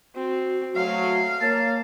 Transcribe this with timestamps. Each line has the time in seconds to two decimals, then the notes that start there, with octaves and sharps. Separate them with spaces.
0.15 C4 F#4
0.76 F#3 A3 F5
1.42 A#3 C#5 A5